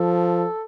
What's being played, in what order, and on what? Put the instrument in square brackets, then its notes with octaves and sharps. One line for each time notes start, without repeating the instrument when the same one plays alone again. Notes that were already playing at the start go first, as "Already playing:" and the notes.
Already playing: [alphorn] F3 [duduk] A4